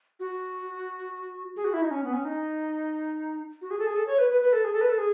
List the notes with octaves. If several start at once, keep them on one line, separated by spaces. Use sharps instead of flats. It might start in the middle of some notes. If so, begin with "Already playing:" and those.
F#4
G#4
F#4
E4
D#4
C#4
B3
C#4
D#4
F#4
G#4
A4
G#4
A4
C#5
B4
B4
B4
A4
G#4
A4
B4
A4
G#4